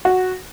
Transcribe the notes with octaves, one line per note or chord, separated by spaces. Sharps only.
F#4